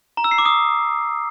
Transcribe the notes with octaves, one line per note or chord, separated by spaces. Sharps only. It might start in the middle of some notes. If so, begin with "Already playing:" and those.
A#5
E6
C7
D6
D#6